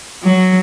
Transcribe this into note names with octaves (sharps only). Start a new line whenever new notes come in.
F#3